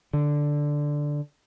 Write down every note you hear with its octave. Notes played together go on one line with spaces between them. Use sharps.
D3